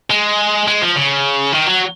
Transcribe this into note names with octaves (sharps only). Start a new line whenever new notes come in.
G#3
G#3
F3
C#3
D#3
F#3